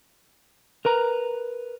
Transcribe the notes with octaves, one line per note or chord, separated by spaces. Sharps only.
A#4 B4 A#5